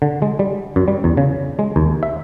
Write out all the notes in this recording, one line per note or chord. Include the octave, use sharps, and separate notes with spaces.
D3
G#3
G3
F#2
G3
E2
C#3
G#3
D#2
E5